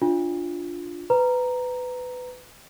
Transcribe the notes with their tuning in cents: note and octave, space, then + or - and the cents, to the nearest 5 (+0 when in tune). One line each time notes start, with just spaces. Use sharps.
D4 +0 F4 +0
B4 +20 A#5 +0